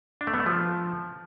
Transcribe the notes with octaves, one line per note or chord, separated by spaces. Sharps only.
D4
A3
B3
A3
F3